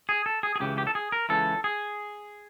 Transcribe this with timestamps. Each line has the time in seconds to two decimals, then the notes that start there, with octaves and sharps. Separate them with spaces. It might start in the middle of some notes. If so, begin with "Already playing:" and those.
0.09 G#4
0.26 A4
0.43 G#4
0.56 G#4
0.60 C#2 C#3 E3 G4
0.78 G4
0.87 A4
0.95 G#4
1.12 A#4
1.29 C#2 C#3 E3 A4
1.64 G#4